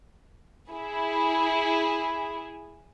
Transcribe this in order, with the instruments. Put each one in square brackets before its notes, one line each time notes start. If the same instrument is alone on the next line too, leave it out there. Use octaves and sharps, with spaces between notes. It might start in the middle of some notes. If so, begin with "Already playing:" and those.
[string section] E4 G#4